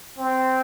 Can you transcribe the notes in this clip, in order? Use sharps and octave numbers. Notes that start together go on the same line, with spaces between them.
C4